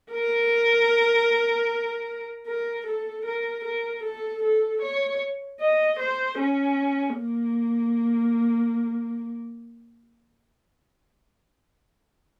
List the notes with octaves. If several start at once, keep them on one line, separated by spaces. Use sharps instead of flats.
A#4
A#4
A4
A#4
A#4
A4
A4
C#5
D#5
C5
C#4
A#3